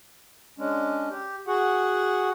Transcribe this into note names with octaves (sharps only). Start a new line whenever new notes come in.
G#3 C#4 D4
G4
F#4 G#4 F#5